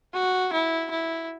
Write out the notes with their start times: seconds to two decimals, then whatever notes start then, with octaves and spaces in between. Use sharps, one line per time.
0.13 F#4
0.53 E4
0.91 E4